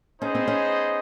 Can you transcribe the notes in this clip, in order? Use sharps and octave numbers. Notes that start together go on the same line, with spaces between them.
B3 C#4 D#4 G#4 C5 D#5
C4
C#4